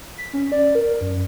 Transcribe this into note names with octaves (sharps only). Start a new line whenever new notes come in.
B6
C#4
D5
A#4
F#2